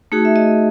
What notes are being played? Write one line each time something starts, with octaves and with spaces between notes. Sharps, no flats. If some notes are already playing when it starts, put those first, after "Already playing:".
A3 D#4 F#4 G#4
E5
D#5